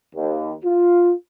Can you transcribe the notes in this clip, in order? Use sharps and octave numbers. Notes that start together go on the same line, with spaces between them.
D#2
F4